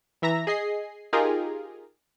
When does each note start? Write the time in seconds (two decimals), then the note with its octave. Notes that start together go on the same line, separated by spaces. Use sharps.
0.22 E3 E5 A#5 A#6
0.47 G#4 D#5 C7
1.13 D#4 F4 G4 G#4 A#4